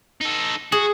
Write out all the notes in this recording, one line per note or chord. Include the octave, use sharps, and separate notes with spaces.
D#4 A4
F#4 G#4